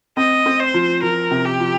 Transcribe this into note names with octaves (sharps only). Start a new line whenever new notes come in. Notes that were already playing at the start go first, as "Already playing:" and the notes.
C4 D#5
C4
C5
F3
F3 A#4
C3
G4
F3